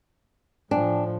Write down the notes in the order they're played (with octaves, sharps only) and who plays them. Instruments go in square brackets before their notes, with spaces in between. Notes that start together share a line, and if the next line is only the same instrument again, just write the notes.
[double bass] A2 F3 [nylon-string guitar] D4 [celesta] D5 G5 G#5